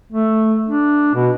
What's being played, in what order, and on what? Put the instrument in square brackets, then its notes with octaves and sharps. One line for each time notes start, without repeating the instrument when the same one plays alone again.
[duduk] A3
D4
B2